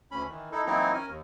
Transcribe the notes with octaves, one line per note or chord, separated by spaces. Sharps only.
D2 C#4 B5
D#3 E3
D#4 E4 A4
E3 F#3 A#3 C4 D#4 E4
C#4 A#4 G#5
D#2